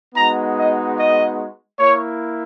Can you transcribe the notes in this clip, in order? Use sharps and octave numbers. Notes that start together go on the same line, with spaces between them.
G#3 B3 D#4 F#4 A#5
D#5
D#5
A#3 E4 C#5